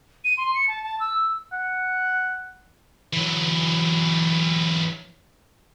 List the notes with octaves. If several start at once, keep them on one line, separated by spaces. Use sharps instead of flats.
D#7
C6
C#7
A5
A5
E6
F#5
E3 F#3